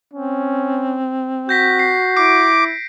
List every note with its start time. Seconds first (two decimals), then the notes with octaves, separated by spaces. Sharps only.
0.13 C4 C#4
1.49 F#4 G6 A#6 B6
1.79 C7
2.17 E4 D6 D7